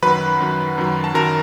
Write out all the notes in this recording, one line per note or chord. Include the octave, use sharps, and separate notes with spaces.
F#2 D#3 F#3 B4 B5
F#2 D#3 F#3
F#2 D#3 F#3
A5
F#2 D#3 F#3 A#4 A#5